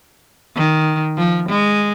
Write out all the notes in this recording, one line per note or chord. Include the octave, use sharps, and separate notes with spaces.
D#3
F3
G#3